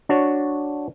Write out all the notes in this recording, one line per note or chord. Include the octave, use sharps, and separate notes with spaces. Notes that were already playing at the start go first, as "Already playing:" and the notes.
D4 F#4 C#5